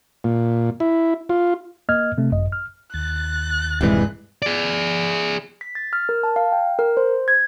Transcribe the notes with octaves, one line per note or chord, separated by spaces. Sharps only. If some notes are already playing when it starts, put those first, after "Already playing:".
A#2
E4
F4
A#3 D#5 F6 G#6
C3 A3 C4
G#1 F#2 D#5
F6
D#2 F#6 A6
D#1 G2 C3 E3 G#3
G#4 D5
B6
A6
F6
A#4
A5
F5
G5
A#4
C5
G#6